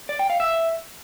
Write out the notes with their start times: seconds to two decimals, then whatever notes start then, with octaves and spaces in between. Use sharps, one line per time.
0.09 D5
0.19 G5
0.30 F5
0.40 E5